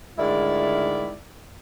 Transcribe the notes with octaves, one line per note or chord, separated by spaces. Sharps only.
D2 G#2 D#3 E4 F4 D5